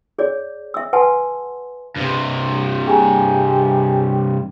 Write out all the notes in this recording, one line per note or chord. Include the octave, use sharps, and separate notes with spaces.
G#4 C#5 D5
E5 E6
B4 F#5 G#5 A5 C6
G2 C3
G4 G#4 G#5 A#5